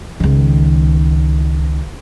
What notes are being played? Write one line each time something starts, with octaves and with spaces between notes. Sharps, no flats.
C#2 D#3